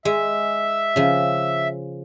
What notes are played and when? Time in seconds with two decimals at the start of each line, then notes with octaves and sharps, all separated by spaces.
0.05 G#3 E5
0.96 C#3 F3